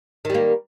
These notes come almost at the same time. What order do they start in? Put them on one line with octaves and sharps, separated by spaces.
D#3 G3 A#3